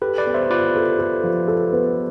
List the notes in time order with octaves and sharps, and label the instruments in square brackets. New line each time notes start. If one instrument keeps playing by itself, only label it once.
[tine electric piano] G4 B4 [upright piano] A4
[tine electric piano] B4 D5
[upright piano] B3
[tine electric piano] C5 E5
[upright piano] F4 [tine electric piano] B4 D5
[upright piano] A4
A4
F3
A4
B3